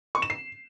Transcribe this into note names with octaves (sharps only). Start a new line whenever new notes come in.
C#6
E7
C7